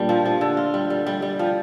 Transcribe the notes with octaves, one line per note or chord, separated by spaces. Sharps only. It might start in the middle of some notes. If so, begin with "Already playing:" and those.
Already playing: A#2 G3 D4
F3
F3
D3
F4
G3
G3
G3
G3
F3